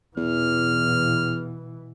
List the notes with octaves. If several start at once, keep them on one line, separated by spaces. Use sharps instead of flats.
E2 B2 E3 F6